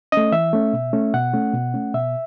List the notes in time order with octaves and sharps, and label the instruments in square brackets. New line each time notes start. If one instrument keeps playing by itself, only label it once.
[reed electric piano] A3 C#4 D#5
E3 E5
A3 C#4
B2
A3 C#4
B2 F#5
A3 C#4
B2
A3 C#4
B2 E5